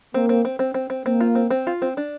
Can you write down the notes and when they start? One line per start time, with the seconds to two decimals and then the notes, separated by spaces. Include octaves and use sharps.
0.14 A#3 C4
0.29 C4
0.45 C4
0.59 C4
0.74 C4
0.90 C4
1.05 A#3 C4
1.21 F4
1.35 C4
1.50 C4
1.67 F4
1.82 C4
1.97 D4